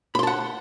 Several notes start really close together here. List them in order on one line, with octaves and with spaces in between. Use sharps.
B5 C6 A5 F#5